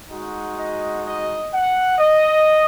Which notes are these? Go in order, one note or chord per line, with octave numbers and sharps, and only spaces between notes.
G#3 D#4 F#4
D#5
D#5
F#5
D#5